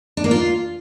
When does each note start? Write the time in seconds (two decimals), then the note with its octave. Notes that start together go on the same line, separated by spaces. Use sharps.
0.17 D4
0.24 A#3
0.31 F4